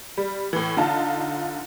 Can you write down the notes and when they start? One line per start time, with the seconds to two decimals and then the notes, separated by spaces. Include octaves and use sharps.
0.18 G3
0.53 A2 E3
0.77 D3 D#4 F4 A5